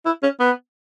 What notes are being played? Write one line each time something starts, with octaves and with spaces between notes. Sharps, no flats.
E4
C#4
B3